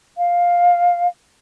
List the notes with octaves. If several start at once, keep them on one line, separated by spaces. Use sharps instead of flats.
F5